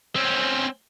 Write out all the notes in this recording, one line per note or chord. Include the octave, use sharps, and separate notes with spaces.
C4 C#4